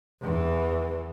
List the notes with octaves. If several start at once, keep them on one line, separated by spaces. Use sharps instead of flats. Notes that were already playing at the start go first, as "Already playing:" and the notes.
E2 E3